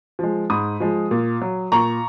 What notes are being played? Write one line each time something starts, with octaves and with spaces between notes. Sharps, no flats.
F3 G#3
G#2 B5 D#6
F3 G#3
A#2
F#3
A#2 A#5 C#6